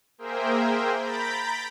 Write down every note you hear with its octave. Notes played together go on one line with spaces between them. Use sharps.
A#3 G#4 A#4 C5 E5 G5
A#5 B5 G6 A6 B6 D7